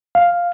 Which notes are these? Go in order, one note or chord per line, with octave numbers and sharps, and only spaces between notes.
F5